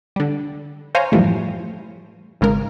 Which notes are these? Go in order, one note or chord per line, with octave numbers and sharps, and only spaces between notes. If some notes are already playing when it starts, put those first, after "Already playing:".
D3 G3
C5 C#5 F5 G#5 A#5
F#2 A2 E3 F3 G3 A3
G#1 C#3 G#3 A#4